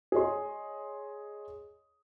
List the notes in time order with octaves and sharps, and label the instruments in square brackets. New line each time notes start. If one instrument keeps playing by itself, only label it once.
[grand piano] G#4 C#5 D#5 C6